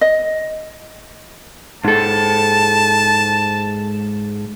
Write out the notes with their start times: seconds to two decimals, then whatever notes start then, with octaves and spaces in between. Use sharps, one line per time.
0.01 D#5
1.84 G#2 A4 A5